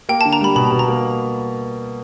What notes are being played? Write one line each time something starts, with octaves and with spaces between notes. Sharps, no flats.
A#3 G5
D3 A5
A#5
G3 B5
B2 B5
B2
A#5
A#3